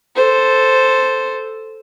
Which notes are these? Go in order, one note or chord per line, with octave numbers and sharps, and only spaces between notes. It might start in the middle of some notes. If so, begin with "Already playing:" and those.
A4 C5